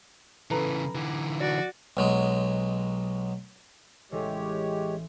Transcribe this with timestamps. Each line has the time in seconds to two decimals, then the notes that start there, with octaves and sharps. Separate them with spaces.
0.51 C#3 E3 A4 B4 A#5
0.95 D3 E3
1.40 F#4 D5
1.97 B1 F#3 G#3
4.12 A1 E3 G#3 G4 C#5